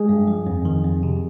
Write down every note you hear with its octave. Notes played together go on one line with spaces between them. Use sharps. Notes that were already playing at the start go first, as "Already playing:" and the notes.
Already playing: G#3 G#4
G2
F3
F2
D#3
F2
C3